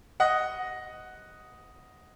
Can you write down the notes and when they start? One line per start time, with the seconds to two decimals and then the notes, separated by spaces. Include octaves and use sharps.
0.20 D#5 F#5